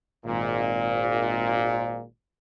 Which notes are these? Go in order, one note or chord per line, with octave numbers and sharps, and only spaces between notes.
G#1 A#2